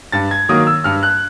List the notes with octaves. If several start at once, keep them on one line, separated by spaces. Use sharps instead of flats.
G2 A6
G#6
D#3 F#3 A#3 D#6
E6
G2 F6
F#6